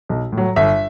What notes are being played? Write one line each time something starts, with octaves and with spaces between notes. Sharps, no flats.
B1
A2
F#3
G1 E5